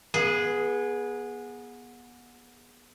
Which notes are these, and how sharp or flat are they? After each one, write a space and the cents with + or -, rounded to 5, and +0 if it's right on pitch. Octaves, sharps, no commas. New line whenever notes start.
B3 -25 G#4 +0 B4 +45